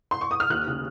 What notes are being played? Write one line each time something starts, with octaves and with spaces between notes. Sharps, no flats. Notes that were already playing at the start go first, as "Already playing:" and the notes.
C6
C#6
D#6
F6
D#2 F#6
C#3